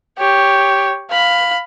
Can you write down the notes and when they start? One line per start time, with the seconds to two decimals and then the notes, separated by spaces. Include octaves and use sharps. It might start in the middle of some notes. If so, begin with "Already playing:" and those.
0.18 G4 C#5
1.10 F5 B5